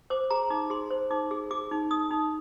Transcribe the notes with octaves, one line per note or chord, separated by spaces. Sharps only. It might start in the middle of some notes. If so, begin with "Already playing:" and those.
C5 D6
G#4 A#5
D#4 D6
G#4 C6
C5
D#4 D6
G#4
G#4 D6
D#4
D#4 D#6
D#4